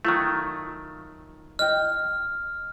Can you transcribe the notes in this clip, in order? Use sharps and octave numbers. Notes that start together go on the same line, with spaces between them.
D#3 F#3 A3 F4
D#5 G5 F6